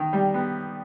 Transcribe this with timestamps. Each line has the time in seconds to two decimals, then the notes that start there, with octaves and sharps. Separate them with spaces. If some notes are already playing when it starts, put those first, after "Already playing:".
Already playing: D#3 D#4
0.13 G3
0.34 B3